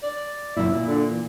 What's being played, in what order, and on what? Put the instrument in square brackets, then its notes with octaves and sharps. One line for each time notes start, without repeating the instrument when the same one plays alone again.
[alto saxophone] D5
[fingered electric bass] F#1 F#2 A#2 [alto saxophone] E4
[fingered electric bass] A#2
[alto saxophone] D3
E3